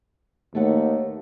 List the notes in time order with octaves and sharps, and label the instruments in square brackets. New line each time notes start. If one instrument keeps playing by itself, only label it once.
[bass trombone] D#2 [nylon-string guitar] A3 B3 F#5